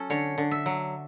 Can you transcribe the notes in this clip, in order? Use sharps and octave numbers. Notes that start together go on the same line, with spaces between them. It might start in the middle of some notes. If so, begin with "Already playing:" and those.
Already playing: F#3 C#4 A4
D3 C#5
D3
E5
F#3